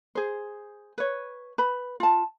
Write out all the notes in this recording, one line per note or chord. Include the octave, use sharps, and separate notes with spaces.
G#4 C5
B4 C#5
B4 B5
F4 A5